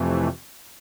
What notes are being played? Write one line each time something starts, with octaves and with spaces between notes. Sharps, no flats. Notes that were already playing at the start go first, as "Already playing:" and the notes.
Already playing: F2 C3 E3 A3